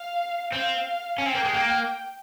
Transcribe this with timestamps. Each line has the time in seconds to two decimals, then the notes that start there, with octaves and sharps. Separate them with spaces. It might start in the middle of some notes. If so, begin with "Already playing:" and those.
Already playing: F5
0.52 C4 F5
1.18 C#4
1.25 C4 G5
1.34 A#3
1.45 G#3
1.54 A#3